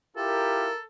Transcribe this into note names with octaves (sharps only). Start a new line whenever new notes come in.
E4 F4 G4 A4 A#4